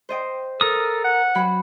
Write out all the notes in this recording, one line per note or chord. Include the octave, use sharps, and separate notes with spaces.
C5 D#5 G5
A4 A#4 D#6
F#5
F#3 G5 B5